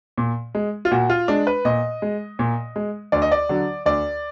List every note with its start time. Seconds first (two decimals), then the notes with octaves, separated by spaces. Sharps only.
0.18 A#2
0.55 G#3
0.85 F4
0.91 A#2 F#4
1.10 F4
1.28 G#3 D4
1.47 B4
1.65 A#2 D#5
2.02 G#3
2.39 A#2
2.76 G#3
3.12 D2 D5
3.22 D#5
3.32 D5
3.49 D3 F#3
3.86 D2 D5